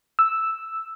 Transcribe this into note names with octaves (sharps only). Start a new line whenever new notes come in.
E6